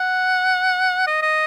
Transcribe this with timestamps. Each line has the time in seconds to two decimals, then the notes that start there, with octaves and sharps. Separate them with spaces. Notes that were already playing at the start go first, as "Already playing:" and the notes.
Already playing: F#5
1.07 D#5
1.22 D#5